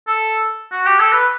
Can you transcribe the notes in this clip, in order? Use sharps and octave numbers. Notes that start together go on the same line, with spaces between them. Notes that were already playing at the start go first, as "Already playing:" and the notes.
A4
F#4
G4
A4
B4